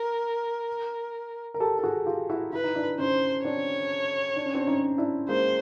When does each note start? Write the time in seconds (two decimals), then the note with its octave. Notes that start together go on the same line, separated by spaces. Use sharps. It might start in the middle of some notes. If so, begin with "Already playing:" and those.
Already playing: A#4
1.54 A#4
1.60 G4 A4
1.79 A4
1.83 F#4 G#4
2.06 F4 G4
2.30 E4 F#4
2.53 E4 B4
2.64 D#4
2.75 D4 E4
2.98 C#4 D#4 C5
3.45 C4 D4 C#5
4.36 D4
4.46 C#4
4.54 C4 D4
4.67 C#4 D#4
4.98 D4 E4
5.29 G#3 A#3 C5